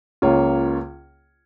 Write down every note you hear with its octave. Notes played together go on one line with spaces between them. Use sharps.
C#2 C#3 A#3 F4 C#5